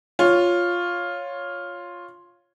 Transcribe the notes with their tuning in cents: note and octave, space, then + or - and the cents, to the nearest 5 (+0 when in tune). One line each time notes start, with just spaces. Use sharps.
F4 +5 C#5 +0